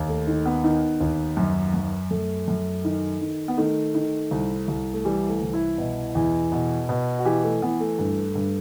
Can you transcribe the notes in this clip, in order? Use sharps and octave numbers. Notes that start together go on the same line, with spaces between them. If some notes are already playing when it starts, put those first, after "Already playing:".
Already playing: D#2
A3
D#3 A3
B3
D#3
D#2
F#2
F#2
F#2 A3
F#2
D#3
D#3
B3
D#3 A3
D#3
C2
C2
A3
E3 G3
A3
C2
E4
B2
E2
B2
B2
F#4
E3 G4
A3
E3 B3
A3
G2
G2